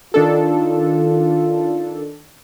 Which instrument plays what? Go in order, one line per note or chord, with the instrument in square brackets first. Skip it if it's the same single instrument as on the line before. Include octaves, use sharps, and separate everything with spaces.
[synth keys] D#3 D4 A4 [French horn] F4